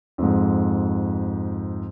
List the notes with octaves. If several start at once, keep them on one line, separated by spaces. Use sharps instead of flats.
F2 G#2